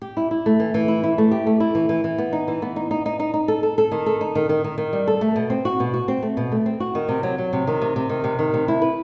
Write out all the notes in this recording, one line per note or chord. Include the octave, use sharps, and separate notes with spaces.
G4
E4
E4
A3
E3
E3
E4
E4
A3
G4
A3
E4
E3
E3
E3
B3
D#4
E3
B3
D#4
D#4
D#4
D#4
D#4
A4
A4
A4
D#3
A4
D#4
D#3
D#3
D#3
D#3
G3
A4
A3
B2
C4
F#4
B2
F#4
C4
A3
B2
A3
C4
F#4
D#3
C3
F#3
F#3
C3
D#3
C3
C3
D#3
C3
D#3
C3
E4
B4